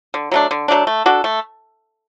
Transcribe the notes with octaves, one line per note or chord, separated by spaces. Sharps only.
D3
F#3 A3 D4
D3
F#3 A3 D4
A3
D4 F#4 A4
A3